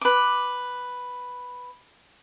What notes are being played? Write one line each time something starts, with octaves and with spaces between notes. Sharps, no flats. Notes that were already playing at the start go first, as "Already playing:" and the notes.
B4 D6